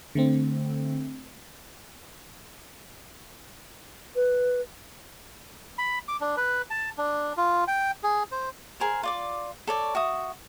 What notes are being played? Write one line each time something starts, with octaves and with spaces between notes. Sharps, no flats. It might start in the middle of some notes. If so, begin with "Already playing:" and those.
D3 A3 C4
B4
B5
D6
D4
B4
A5
D4
F4
G5
G#4
C5
G#4 A#4 C5
F4 D5 D6
A4 C#5 D5
F#4 E5 D#6